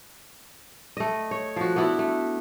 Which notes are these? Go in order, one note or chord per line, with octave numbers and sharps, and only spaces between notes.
A3 D#5
C#5
F3 F#4
B3 D4 E4 F#4
A3